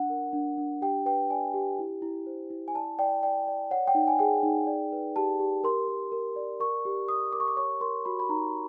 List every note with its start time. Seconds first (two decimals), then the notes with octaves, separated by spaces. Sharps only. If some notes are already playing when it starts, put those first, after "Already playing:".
Already playing: D4 F#5
0.10 A#4
0.33 D4
0.58 D4
0.82 G4 G5
1.06 B4 G5
1.30 D5 G#5
1.54 G4
1.79 E4
2.02 E4
2.27 C5
2.50 E4
2.68 G#5
2.74 D5 A5
2.99 D5 G5
3.23 D5 G5
3.48 D5
3.71 C#5 F#5
3.87 G5
3.95 D#4
4.08 G#5
4.19 G#4 G5
4.43 D#4
4.67 D5
4.92 B4
5.16 G4 A5
5.40 G4
5.64 A#4 C6
5.88 A#4
6.12 A#4
6.36 D5
6.60 A#4 C#6
6.85 G4
7.08 G4 D#6
7.33 A#4 D6
7.40 C#6
7.48 D6
7.57 C#5 C#6
7.81 A#4 C6
8.05 F#4 B5
8.19 B5
8.29 D#4 A#5